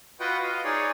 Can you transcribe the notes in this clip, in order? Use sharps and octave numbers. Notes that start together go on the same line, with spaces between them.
F4 F#4 B4 D#5 F#5 G5
D#5 F5
D#4 G#4 C#5 D5